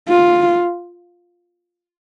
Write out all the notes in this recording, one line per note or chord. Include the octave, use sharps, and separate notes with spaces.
F4